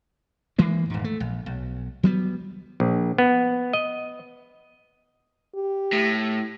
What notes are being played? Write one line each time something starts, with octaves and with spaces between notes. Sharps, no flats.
E3 G#3 A#3
D#1 G#2
A3
A#1
B1
F#3 G3 B3
A#1
B3
D#5
G4
A2